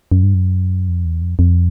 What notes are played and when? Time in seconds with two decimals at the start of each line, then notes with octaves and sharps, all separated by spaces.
0.12 F#2
0.23 G2
0.34 F#2
0.88 F2
1.05 E2
1.22 F2
1.39 F2